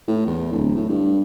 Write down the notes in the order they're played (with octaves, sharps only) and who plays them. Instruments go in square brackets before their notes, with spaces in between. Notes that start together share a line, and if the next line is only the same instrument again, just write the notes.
[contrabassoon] A2
E2
D1
A2
G2